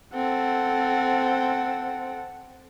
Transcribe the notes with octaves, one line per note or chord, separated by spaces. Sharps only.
C4 A4 F#5